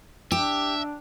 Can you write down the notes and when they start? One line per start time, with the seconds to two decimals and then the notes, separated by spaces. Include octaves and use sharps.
0.32 D4 G4 E5